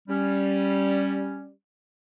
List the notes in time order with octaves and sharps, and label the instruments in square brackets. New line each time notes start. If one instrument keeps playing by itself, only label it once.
[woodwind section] G3 C#4